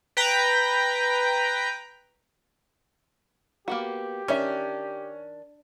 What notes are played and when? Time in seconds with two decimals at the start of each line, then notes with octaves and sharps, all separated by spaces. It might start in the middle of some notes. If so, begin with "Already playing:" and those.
0.17 B4 G5 A#5 B6
3.68 A#3 B3 F#4 G4
4.28 D#3 C#4 D4 E5